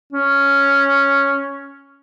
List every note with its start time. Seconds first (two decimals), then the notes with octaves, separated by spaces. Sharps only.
0.13 C#4